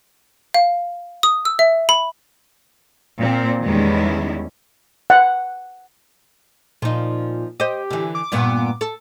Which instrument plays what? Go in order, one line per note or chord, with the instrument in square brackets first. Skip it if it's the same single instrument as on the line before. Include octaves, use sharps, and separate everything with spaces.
[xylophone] F5
D#6
E6
E5
B5
[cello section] A#2 C4
E2 D#3 G3 G#3 C#4 E4
[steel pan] F#5
[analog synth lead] A#2 [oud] F3 D#4
[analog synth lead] G4 [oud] C5 D#5
[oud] D3 E3
[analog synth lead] D6
[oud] G2 A#2 B3
A4